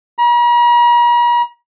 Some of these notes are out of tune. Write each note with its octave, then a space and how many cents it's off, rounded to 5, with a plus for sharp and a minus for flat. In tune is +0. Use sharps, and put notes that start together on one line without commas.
A#5 +45